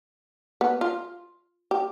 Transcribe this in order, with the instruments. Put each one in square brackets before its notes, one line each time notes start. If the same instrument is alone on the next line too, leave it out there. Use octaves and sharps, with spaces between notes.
[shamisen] B3
F4
G4